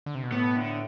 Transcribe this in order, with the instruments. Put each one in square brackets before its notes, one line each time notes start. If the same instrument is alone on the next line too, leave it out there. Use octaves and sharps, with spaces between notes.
[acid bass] D3
C3
B2
[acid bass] A2 [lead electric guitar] B3
[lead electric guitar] D3